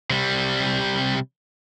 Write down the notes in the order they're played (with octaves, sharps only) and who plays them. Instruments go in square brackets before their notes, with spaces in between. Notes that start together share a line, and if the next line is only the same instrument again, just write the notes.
[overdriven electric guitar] C3 G3